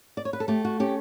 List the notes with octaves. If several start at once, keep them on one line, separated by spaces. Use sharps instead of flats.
D5
C#5
B4
A4
A3 G4
F#4
C#4 G4